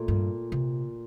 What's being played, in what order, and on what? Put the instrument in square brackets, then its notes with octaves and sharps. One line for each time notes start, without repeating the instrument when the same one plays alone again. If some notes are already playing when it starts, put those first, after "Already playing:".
Already playing: [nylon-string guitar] A#2 A3
[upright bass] G2
C3